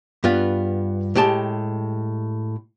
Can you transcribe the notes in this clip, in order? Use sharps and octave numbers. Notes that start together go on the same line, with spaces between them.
G2 B3 F4
A2 G#3 G4 A5